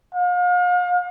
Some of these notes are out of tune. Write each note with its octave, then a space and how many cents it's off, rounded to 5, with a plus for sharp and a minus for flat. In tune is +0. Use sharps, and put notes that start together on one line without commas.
F5 +40